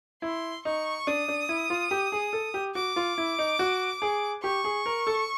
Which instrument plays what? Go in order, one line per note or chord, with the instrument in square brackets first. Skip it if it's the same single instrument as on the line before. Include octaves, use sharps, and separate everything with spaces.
[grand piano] E4 [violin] C6
[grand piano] D#4 [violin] C#6
[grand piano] D4 [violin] D#6
[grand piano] D4
E4
F4
G4
G#4
A4
G4
[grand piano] F#4 [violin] D6
[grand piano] F4
E4
D#4
F#4
G#4
[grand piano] G4 [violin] C#6
[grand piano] G#4
A#4
A4